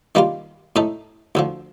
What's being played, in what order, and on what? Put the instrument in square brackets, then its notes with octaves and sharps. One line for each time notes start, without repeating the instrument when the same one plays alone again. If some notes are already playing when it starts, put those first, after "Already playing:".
[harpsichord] D#3 G3 A#3 F4
A2 A3 D#4 A4
D2 D3 F3